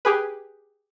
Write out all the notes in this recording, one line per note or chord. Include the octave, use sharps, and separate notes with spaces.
G4 G#4 B4